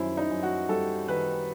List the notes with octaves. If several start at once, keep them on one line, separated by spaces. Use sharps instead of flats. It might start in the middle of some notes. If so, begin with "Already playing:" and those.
Already playing: F#2 D#3 G3 E4 C5
D#4
F#2
F#4
G3 A4
D#3 B4